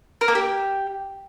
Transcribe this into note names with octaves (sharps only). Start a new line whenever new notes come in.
A#4
A#3
G4